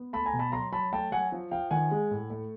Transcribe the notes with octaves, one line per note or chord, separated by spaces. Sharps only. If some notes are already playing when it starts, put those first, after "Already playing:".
Already playing: B3
A3 A5 B5
G#5 A#5
B2
A5 B5
F#3 A#5 C6
F#3 A5 B5
A3 G5 A5
F#3 F#5 G#5
F3
F3 F5 G5
D#3 F#5 G#5
G#3
A2
A3